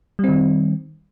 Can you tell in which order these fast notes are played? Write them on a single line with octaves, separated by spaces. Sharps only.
G3 C4 D#3